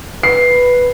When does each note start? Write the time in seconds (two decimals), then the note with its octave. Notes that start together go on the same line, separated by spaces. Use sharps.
0.23 B4 C7